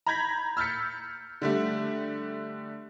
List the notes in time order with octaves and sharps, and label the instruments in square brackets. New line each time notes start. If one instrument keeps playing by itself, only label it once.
[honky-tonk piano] A#5 B5 G6 G#6 A#6 B6
E6 F6 G6 A6 B6 C#7
D3 G3 A3